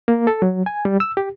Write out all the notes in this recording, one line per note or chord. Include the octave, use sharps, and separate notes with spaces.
A#3
A4
F#3
G#5
G3
E6
G4